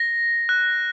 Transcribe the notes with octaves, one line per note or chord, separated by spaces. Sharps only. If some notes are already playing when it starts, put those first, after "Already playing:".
Already playing: A#6
F#6